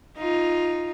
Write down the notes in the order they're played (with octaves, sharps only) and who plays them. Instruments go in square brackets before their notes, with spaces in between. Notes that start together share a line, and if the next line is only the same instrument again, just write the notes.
[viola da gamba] D#4 F4